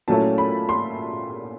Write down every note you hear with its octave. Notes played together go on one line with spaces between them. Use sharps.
A#2 F#3 A3 C#4 E4 A5
B5
C6